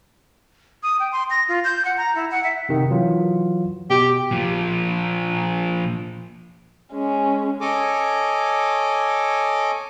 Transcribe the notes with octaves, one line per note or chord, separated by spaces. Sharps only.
D#6
G5
C6
A#6
F4
G6
F#5
A#5
E4
F#5
E5
C3 D#3
E3 F#3 F4
B2 G4
A#2 F3
G#3 C#4
A4 C#5 D#5 G#5 D6